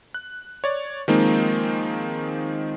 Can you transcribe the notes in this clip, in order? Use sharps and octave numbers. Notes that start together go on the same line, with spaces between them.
F#6
C#5 D5
D#3 F3 G#3 A#3 C4 D#4